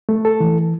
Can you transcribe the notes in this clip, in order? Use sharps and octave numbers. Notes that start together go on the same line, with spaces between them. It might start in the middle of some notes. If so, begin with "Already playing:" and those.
A3
A4
E3